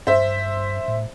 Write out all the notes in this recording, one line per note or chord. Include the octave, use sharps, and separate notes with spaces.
G2 C5 E5
A2